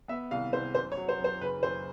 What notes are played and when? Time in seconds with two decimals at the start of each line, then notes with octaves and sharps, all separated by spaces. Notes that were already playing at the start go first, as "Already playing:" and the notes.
0.08 B3 E5
0.31 C2 F5
0.53 C2 C5
0.75 F#2 C5
0.92 C#5
0.97 F#3
1.09 C5
1.19 F#2 C5
1.41 F#1 B4
1.63 F#2 C5